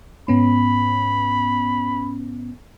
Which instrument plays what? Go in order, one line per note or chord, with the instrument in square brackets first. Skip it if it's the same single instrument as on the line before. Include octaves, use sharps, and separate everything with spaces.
[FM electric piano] G#2 B3 C#4 [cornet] B5